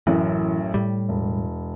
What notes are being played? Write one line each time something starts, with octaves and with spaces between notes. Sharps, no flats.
A1 F#2 A2 E3
A2 G3
E1